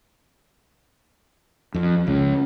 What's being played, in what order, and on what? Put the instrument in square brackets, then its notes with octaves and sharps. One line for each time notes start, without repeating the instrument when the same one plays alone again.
[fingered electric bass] F2
C#2